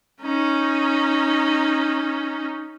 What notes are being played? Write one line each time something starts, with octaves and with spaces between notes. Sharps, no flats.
C#4 D#4